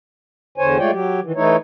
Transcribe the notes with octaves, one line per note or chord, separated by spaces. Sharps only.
E2 D3 C5 C#5 G#5
G#3 A3 F4 C#5 D5 G5
F#3 G4
D#3 E3
E3 A3 D#4 E4 C#5